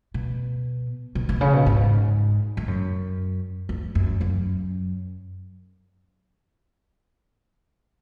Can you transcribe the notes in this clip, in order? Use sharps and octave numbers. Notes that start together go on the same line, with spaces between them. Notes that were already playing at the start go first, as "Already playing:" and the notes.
B2
B2
B2
C#3
B2
G#2
G#2
F#2
E2
F#2
F#2